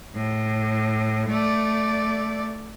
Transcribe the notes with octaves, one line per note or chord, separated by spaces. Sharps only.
A2
A3 D5